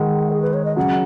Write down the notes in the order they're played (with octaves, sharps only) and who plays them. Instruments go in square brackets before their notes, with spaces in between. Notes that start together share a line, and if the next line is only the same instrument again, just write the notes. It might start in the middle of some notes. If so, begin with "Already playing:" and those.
Already playing: [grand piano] D#3 G#3 [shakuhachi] F#5
[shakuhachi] G#4
B4
C#5
D#5
[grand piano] C#3 F#3 [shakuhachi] F#5